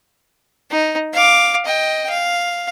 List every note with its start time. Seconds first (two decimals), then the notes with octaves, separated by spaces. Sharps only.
0.71 D#4
1.13 F5 D6
1.66 D#5 G5
2.09 F5